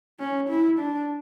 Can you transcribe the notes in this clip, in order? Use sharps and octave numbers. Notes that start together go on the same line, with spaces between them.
C#4
E4
D4